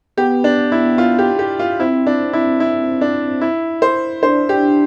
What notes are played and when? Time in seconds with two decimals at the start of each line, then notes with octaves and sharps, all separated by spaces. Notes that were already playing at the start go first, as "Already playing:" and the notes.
0.17 B3 G4
0.44 D4
0.72 E4
0.98 F4
1.19 G4
1.39 G4
1.59 F4
1.80 C4 E4
2.07 D4
2.33 E4
2.60 E4
3.01 D4
3.41 E4
3.82 C5
4.22 D4 C5
4.49 G4